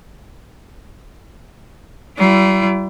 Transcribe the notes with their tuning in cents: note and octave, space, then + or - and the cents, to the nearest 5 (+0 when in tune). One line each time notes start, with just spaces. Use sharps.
G3 -40 E4 +35